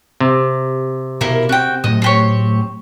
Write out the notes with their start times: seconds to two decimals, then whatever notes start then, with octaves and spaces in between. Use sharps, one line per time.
0.20 C3
1.21 B2 A#3 E4 A#4
1.49 C4 F#4 G5
1.84 A2 F#3 A3 D#5
2.02 C4 G4 C#5